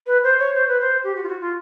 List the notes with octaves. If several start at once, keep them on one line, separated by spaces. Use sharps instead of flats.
B4
C5
C#5
C5
B4
C5
G4
F#4
F4
F#4
F4